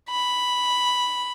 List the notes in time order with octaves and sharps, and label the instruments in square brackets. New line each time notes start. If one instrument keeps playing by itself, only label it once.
[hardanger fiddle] B5